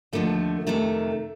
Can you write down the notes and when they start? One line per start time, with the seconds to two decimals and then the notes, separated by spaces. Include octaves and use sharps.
0.13 D#2 D3 F3 A3
0.67 F2 C3 D#3 A3